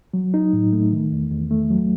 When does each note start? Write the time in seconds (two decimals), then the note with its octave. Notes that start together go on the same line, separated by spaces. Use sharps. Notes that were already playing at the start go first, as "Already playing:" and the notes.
0.14 F#3
0.34 D#4
0.53 A2
0.73 A3
0.92 D#3
1.12 E2
1.31 E2
1.51 A3
1.70 F#3